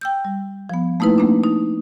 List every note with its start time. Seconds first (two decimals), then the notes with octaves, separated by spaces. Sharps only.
0.01 G5 E6 G6
0.25 G3
0.69 F3 B3
1.00 A3 A#3 D#4 E4 B4
1.18 A3 A#3 C4 D4
1.43 D#4